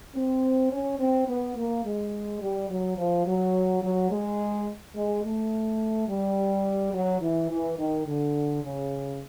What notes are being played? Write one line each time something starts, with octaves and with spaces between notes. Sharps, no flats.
C4
C#4
C4
B3
A#3
G#3
G3
F#3
F3
F#3
F#3
G#3
G#3
A3
G3
F#3
E3
E3
D#3
D3
C#3